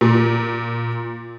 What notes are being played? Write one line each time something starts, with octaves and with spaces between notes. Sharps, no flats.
A#2